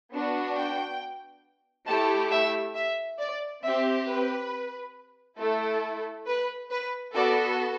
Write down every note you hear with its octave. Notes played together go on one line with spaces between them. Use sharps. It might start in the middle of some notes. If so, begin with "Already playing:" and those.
B3 D4 F#4
G5
A3 E4 G4 A5
E5
E5
D5
C4 G4 E5
B4
A3 E4 A4
B4
B4
B3 F#4 A4 D5